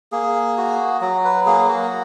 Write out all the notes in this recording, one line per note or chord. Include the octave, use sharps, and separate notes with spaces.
A#3 G#4
F#4
F#3 F#4
B4
A#3 G#4
F#4